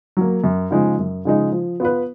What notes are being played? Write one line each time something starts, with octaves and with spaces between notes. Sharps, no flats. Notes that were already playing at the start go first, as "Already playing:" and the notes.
F#3 A#3
F#2
C#3 F3 G#3 D#4
F#2
C#3 F3 G#3 D#4
F3
B3 F4 B4